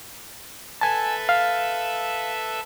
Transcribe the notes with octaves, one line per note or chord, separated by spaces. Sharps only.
A4 B4 E5 G#5 A5
F5